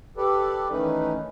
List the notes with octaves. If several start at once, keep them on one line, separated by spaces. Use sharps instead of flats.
G4 A4 B4 D5
D#3 E3 A3 C#4 D#4 B4